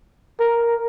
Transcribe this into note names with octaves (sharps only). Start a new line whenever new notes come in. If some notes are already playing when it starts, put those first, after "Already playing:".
A#4